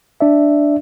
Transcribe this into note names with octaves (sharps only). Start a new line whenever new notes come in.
D4 D5 E5